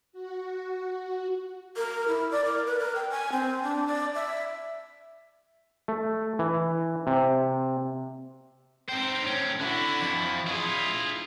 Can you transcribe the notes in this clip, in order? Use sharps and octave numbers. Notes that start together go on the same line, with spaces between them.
F#4
A#4
E4
D5
A#4
B4
A#4
G5
G#5
C4
D4
D5
E5
A3
E3
C3
C4 D#4 C5 G5
A2 C#4
D3 E4 F#4
F2 F3
E4 F4 G#4 D#5